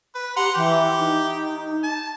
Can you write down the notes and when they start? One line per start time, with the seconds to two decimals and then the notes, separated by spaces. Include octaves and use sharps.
0.15 B4
0.36 G4 F#5 A#5 C6
0.55 E3 G4
0.98 D#4
1.84 A5